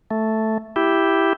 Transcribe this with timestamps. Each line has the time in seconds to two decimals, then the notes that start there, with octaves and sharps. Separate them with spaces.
0.11 A3
0.76 E4 G4